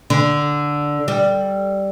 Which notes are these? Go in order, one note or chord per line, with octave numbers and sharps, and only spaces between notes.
D3
G3